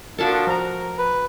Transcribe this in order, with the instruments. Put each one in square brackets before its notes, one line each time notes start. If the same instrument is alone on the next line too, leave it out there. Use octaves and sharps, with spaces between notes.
[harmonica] F3 A#3 D4 [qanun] F#4 F5 A5 [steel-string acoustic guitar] A4
[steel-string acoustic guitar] F3 A#5 [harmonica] A#4
[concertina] B4